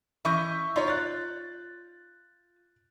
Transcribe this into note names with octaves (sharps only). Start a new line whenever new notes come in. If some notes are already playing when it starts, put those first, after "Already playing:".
E3 C#4 D#5 E5 C#6 G6
D#4 F4 C#5
F#6 A6